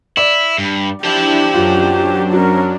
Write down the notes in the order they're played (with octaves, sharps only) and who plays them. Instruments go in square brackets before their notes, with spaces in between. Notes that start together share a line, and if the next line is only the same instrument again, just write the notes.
[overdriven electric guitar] E4 [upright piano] D5
[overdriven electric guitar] G2
[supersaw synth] D4 E4 [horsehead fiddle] G4 [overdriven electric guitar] C5 A5
[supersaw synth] F#2 F#3 D4 [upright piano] F4
[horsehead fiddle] C#4 A#4 [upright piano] F#4